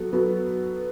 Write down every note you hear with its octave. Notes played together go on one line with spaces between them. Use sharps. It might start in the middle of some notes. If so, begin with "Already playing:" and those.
Already playing: F#3 B3 F#4 A4
F#3 B3 F#4 A4